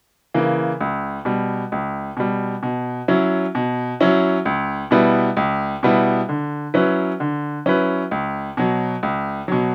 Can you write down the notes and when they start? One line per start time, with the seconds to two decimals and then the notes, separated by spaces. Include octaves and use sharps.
0.34 C#3 E3 A#3
0.81 C#2
1.25 B2 G3
1.72 C#2
2.17 B2 G3
2.63 B2
3.08 F#3 C#4 E4
3.55 B2
4.00 F#3 C#4 E4
4.45 C#2
4.91 B2 G3 B3 E4
5.37 C#2
5.83 B2 G3 B3 E4
6.29 D3
6.74 F#3 C#4 E4 B4
7.20 D3
7.66 F#3 C#4 E4 B4
8.11 C#2
8.57 B2 F#3
9.03 C#2
9.48 B2 F#3